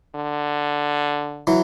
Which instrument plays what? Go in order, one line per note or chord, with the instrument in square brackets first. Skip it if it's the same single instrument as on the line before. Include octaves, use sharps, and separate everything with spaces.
[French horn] D3
[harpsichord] E3 F#3